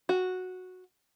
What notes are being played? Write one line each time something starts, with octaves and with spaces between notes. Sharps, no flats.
F#4